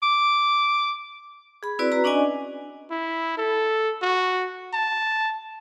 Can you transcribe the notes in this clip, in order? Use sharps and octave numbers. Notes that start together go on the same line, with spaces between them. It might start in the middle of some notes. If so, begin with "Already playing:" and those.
D6
G#4 B5
C4 E4 F#4 B4 D5
F#4 B4 A#5
C#4 D4 D5 D#5 G#5
E4
A4
F#4
A5